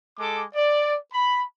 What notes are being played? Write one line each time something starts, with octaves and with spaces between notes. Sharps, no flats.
G#3 A4 D6
D5
B5